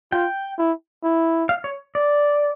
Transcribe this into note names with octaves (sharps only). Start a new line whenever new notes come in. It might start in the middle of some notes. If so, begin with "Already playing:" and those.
F4 G5
E4
E4
F5
C#5
D5